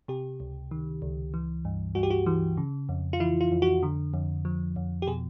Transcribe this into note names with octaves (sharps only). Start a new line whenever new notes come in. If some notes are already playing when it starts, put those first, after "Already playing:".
C3 G4
C#2
D#3
C#2
E3
G2
G2 F#4
G4
F#4
E3
C#3
F2
F4
E3 E4
F4
F2
F#4
D3
F2
F3
F2
G4
B2 G#4